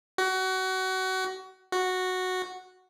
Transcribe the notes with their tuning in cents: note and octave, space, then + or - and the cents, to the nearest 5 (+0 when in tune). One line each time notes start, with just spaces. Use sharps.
F#4 +25
F#4 -5